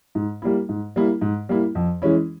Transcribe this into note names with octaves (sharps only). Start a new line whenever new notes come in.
G#2
G3 A#3 E4
G#2
G3 A#3 E4
G#2
G3 A#3 E4
F2
E3 G#3 C#4 E4